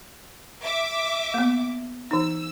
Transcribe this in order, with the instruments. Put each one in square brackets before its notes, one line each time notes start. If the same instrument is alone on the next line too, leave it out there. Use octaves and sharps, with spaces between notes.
[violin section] E5 D6
[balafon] A#3 B3
[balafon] E3 D#4 [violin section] E6